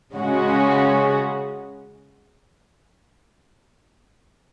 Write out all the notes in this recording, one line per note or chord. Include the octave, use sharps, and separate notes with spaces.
C#3 G#3 C#4 F#4